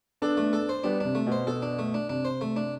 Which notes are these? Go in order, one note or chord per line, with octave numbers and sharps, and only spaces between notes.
B3 D4 A4
A3
A4
C5
G3 B3 D4
C3 D4
A3
B2
C5
B2 A4
D4
A3
D4
C3 D4
C5
A3
D4